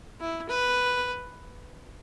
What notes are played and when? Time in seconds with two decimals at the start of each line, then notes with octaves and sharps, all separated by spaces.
0.20 E4
0.49 B4